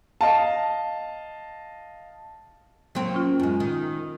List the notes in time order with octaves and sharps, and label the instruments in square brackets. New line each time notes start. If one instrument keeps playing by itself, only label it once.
[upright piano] D#5 F5 A5
[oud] F#3 A#3 C4
[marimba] C#4 F4
[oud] F#2 G#3
D#3